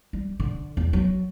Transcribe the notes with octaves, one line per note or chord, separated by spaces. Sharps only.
G3
D3
E2
F#3